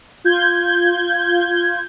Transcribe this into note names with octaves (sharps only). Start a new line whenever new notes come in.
F4 G6 G#6